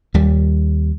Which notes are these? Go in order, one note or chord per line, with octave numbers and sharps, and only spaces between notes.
D#2 G3